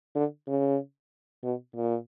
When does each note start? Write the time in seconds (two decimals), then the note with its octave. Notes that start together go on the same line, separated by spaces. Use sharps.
0.15 D3
0.47 C#3
1.43 B2
1.76 A#2